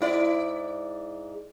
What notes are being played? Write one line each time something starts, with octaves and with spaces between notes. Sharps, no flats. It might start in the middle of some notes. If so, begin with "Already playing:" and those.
G#2 E4 D5